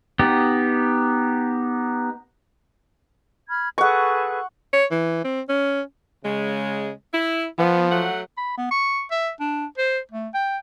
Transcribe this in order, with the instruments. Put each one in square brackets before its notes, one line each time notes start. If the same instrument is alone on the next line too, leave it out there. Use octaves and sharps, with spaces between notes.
[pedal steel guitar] B3 D#4 G4
[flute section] B5 F6 G#6
[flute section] G#4 A4 B4 [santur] F#5 C#6
[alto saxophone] C#5
E3
C4
C#4
[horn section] C#3 G#3
E4
[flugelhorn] F3 [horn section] B3
[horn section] F#3 A3 F#5
[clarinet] B5
B3
C#6
E5
D4
C5
A3
G5